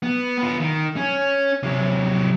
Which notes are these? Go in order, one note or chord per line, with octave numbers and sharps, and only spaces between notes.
B3
B3 F4
D#3
C#4
C3 F#3